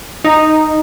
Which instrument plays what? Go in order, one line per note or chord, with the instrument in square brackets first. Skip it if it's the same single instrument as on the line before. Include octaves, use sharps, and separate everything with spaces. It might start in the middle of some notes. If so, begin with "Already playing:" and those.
[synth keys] D#4